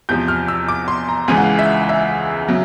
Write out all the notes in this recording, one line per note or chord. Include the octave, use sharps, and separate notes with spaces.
E2 C3 F3 G6
F6
E6
D6
C6
A#5
C#2 C#3 E3 G#5
F#5
F5
E5
E5
C#3 F#3